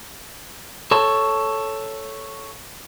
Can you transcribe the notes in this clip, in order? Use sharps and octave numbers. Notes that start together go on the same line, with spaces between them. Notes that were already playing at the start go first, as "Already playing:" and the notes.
A4 C#5 A5